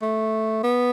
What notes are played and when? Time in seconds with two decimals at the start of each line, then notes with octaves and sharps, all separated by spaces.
0.02 A3
0.63 B3